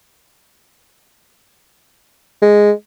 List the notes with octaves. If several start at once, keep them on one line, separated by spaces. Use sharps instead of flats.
G#3